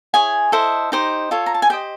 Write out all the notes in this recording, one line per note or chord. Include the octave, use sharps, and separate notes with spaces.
E4 G#4 C#5 G#5
E4 A4 C5 D#5
D#4 G4 C5 D#5
F4 A4 C#5
A#5
A5
G#5
G4 C5 D#5 G5